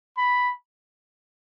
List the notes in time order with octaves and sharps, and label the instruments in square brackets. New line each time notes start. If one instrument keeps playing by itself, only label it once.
[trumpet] B5